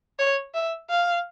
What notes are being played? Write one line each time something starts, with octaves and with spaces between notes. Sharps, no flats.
C#5
E5
F5